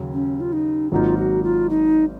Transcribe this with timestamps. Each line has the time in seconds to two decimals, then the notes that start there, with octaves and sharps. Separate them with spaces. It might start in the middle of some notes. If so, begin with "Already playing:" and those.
Already playing: D#2 C#3 F#3
0.13 C#4
0.40 F4
0.53 D#4
0.92 G#1 G#2 F#3 A#3 D#4 F4
1.17 F#4
1.44 F4
1.70 D#4